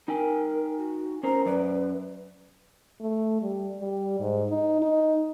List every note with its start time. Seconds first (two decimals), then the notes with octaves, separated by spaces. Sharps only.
0.08 D#4 A#4 G5 G#5
0.77 F#4
1.23 C#4 A#4 C5 A#5
1.46 F#2 B4 D5
3.01 A3
3.42 G3
3.80 G3
4.20 G#2
4.50 D#4
4.82 D#4